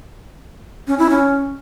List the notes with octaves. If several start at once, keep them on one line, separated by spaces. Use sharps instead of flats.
C#4
E4
C#4